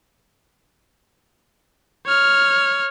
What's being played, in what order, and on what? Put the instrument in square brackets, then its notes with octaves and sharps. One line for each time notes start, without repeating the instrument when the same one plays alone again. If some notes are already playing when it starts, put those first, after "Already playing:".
[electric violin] C#5 F6